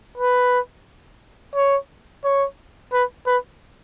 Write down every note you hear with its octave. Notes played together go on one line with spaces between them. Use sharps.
B4
C#5
C#5
B4
B4